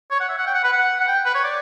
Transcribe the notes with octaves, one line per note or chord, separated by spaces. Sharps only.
C#5
F#5
E5
F#5
G5
F#5
B4
F#5
F#5
G5
B4
C#5
D5